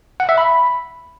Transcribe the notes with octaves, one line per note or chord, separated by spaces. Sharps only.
F#5
E5
B5